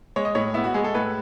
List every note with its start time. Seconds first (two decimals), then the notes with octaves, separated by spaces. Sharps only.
0.16 G#3 C#5
0.25 D#5
0.35 A2 C#5
0.54 B3 E4
0.64 F#4
0.74 G#3 G#4
0.84 A4
0.95 A2 B4